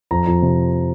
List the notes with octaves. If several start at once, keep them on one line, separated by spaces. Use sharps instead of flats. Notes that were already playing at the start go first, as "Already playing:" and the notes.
F2 A#5
F2
C3